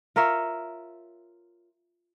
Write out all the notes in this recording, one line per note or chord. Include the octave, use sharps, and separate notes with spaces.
F4 A#4 C#5 E5